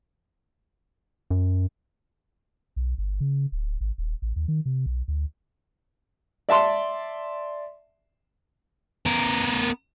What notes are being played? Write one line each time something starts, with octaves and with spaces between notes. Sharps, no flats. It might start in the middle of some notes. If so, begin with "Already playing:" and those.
F#2
B1
G1
C#3
D1
G#1
D#1
A1
D#2
D#3
C3
B1
D2
D5 E5 A5 C6
B3 A#4